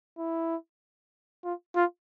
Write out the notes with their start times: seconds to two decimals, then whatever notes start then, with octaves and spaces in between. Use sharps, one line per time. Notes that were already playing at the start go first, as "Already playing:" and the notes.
0.18 E4
1.44 F4
1.75 F4